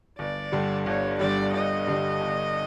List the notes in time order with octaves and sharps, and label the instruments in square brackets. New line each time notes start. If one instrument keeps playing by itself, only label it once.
[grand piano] G1 [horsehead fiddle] D5
[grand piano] G2 D3 G3
[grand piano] G1 [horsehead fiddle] C#5
[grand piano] G2 D3 G3 [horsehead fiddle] D5
[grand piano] G1 [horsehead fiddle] D#5
[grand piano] G2 D3 G3
G1